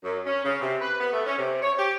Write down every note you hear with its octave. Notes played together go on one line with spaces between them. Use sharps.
F#2
C#4
C#3
C3
B4
B3
A3
C#4
C3
C#5
G4